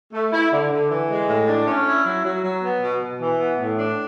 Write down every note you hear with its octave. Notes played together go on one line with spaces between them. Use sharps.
A3
E4
D3
D3
E3
G#3
A2
D4
C#4
E4
F#3
F#3
F#3
B3
B2
B2
E3
B3
A2
D4